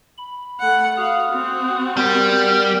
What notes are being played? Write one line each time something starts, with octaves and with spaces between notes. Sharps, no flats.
B5
A3 F#5
F#4 F5 D#6
C4 F#4
G3 B3 A#4 G5